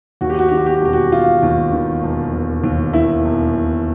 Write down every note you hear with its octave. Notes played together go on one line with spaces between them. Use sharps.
D#2 F#4
G4
F#4
D#3 G4
F#4
G4
F#4
E1 G4
F#4
E1 F4
D#2
D#3
E1
E1
D#2
D#3 E4
E1
E1